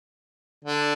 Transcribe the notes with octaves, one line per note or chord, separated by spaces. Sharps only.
D3